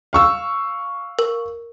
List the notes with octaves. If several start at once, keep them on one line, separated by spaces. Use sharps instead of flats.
F5 C#6 E6
A#4